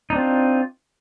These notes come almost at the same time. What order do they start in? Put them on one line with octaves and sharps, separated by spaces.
D#4 D4 C4 F4